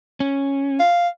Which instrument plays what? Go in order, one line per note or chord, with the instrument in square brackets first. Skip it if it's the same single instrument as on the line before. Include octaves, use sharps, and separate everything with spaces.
[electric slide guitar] C#4
[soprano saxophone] F5